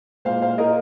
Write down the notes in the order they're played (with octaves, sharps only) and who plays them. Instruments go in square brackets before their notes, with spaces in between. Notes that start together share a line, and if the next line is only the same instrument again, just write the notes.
[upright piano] A#2 G#3 C5 F5
C5 F5
A#4 D#5